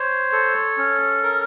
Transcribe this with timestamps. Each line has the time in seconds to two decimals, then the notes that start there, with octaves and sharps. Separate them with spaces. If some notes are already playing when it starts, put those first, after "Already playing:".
Already playing: C5 C#5
0.32 A4
0.77 C#4
1.23 A#4